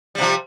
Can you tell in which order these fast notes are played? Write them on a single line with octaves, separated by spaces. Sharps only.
G3 C3 F3